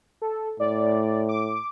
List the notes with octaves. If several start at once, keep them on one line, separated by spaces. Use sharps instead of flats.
A4
A2 D5
D6